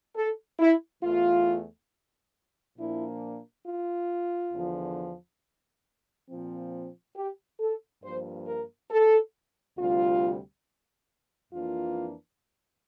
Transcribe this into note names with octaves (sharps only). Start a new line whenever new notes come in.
A4
E4
E2 E3 A3 F4
A#2 F3 A#3 D4 E4
F4
E2 D3 F3
A#2 F3 C4
G4
A4
G2 F3 A#3 C5
A#4
A4
D2 C3 G3 F4
F2 E3 A#3 D4 F4